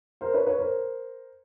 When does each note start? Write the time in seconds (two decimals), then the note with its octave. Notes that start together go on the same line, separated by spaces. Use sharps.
0.21 A#4 C5
0.34 B4 C#5
0.46 B4 C#5
0.59 A#4 C5